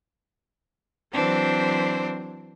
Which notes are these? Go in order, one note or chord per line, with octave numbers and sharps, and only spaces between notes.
E3 F#3 C4 D4 C5